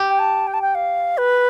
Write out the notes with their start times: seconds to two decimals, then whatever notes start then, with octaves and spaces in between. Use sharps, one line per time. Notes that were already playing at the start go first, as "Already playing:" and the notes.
Already playing: G4
0.09 G5
0.19 A5
0.47 G5
0.54 A5
0.62 G5
0.75 F5
1.18 B4